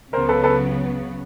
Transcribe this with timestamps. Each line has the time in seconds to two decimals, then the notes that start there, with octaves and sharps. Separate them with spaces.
0.13 C#2 C#3 F#3 B3 A#4 C5
0.29 A4 B4
0.43 A4 B4